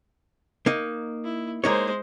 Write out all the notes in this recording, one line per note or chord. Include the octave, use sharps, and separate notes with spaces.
A#3 D#4
E4
G#3 A#3 D#4 C5 C#5